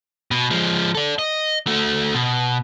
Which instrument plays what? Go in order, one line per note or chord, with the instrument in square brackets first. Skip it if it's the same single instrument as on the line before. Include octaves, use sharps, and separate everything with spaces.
[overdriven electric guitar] B2
F3 G#3
A4 D5
D#5
A3 F#4
B2